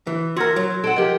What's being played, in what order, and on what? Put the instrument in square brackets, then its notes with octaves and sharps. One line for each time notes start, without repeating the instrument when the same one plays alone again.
[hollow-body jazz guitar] E3
[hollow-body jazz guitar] F#4 A#4 [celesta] C6 E6 G#6
[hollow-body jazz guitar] F#3
[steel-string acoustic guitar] A4 C5 F#5 [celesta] D7
[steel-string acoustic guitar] F3 G4 A#4 [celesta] D#5